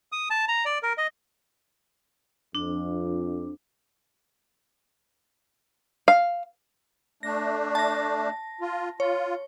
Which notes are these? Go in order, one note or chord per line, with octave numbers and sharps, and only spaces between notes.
D#6
A5
A#5
D5
A#4
D#5
F2 D4
F5
A3 D4 A#6
A5 A#6
F4
F4 C#5